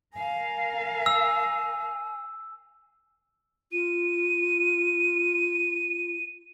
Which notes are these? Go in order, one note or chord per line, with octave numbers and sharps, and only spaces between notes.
A#4 F5 G#5
E6
F4 D#7